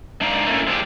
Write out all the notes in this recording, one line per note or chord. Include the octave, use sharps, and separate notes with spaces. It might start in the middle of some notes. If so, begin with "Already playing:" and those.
G#3 D4 D#4 D5 F5 A#5
A3 A#3 C#4 E4
F3 G#3 D4 E4 G4